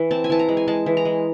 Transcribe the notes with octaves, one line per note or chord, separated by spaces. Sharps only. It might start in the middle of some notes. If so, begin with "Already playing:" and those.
Already playing: E3
C4 A5
G#5
E3 A5
A#5
G#3
G#5
G#3 A5
E3
A#5
G#3